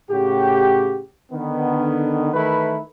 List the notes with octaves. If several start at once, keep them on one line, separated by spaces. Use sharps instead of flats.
A2 C#3 F#4 G4
D3 D#3 B3
D#3 E3 A3 E4 A#4 B4